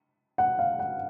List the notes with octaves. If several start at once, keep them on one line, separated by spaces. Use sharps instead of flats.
F#5
F5
F#5